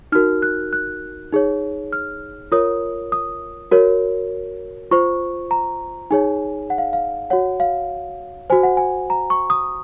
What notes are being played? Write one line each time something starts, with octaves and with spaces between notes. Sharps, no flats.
D#4 F#4 A#4 F6
F#6
F#6
D#4 G#4 C#5
F6
F4 A#4 C#5 D#6
D#6
F#4 A#4 C#5
F4 C5 C#6
A#5
D#4 G#4 C#5 G#5
F#5
F5
F5
F#4 C#5 F#5
F5
F#4 C5 G#5
F#5
G#5
A#5
C#6
D#6